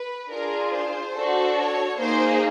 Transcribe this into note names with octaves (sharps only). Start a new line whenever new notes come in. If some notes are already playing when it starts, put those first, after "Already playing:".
Already playing: B4
D4 F4 G#4 A#4
C5
D4 F#4 A4
C#5
A#3 D#4 G#4 C5